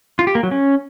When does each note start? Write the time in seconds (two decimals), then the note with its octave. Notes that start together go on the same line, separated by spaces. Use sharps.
0.19 F4
0.27 G4
0.35 A#3
0.43 F#3
0.51 C#4